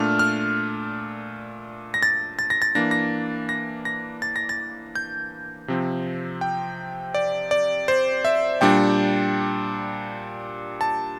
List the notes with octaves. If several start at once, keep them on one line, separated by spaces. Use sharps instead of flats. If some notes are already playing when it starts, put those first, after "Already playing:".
Already playing: A#2 A3 D4 F6
F6
A#6
A6
A6
A#6
A6
E3 A#3 D4 A#6
A#6
A#6
A#6
A6
A#6
A6
G6
C3 F3 C4
G5
D5
D5
C5
E5
A#2 G3 D4 G5
A5